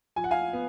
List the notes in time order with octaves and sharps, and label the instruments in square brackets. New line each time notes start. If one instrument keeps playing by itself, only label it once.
[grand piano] F3 G#5
F#5
F5 G#5
B3